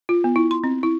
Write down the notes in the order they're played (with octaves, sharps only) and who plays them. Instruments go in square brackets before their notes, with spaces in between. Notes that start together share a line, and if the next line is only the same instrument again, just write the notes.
[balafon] F4
B3
E4
C6
C4
E4